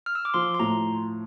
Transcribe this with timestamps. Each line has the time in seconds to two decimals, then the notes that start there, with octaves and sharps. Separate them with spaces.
0.06 F6
0.15 E6
0.25 D6
0.34 F3 C6
0.54 C6
0.59 A2 A#5